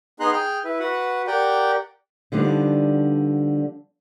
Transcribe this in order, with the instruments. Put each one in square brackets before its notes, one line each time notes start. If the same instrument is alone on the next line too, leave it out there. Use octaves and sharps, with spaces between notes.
[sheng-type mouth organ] B3 D#4 G#4 A#5 C6 F#6
G#4 G5 F6
E4 B4
F#4 B4 F#5
G4 A#4 D5 F#5 G5
[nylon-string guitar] D3 F3 G3 B3 D4 D#4